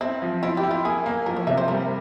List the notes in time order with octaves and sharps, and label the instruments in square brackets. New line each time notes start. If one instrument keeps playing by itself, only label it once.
[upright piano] C4 [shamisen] E4
[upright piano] F3
[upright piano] E4 [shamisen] F4
[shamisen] G4
[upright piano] E4
[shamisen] F4
[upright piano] A#3 [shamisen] G#4
[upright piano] A#3
[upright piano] F3 [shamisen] A#4
[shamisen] C#5
[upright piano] C3 [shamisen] E5
[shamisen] C5
[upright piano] G3 [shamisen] A#4